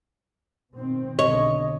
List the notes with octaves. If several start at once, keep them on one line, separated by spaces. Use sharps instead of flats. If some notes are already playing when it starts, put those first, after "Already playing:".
B2 D#3 C4
B1 D3 C#5 D#5